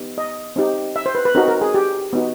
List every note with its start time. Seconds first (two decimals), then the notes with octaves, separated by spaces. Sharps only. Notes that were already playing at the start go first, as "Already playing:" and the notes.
Already playing: B3 D#4 G4
0.18 D#5
0.56 C4 D#4 G4
0.96 E5
1.06 C5
1.15 B4
1.25 B4
1.35 C4 D#4 F#4 A#4
1.48 A#4
1.61 G#4
1.74 G4
2.13 B3 D#4 F#4